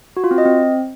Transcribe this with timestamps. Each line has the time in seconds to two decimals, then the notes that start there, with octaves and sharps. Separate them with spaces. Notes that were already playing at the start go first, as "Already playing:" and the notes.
0.17 F#4
0.24 F4
0.31 C4
0.38 D#5
0.45 C4